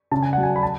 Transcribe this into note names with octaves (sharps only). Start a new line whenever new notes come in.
C#3 A5
G#5
F#3 F#5
G#5
B5
A5